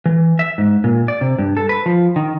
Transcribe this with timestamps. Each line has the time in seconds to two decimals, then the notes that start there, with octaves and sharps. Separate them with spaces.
0.06 E3
0.39 E5
0.58 G#2
0.84 A#2
1.08 D5
1.21 C3
1.38 G2
1.57 A4
1.69 B4
1.86 F3
2.16 D#3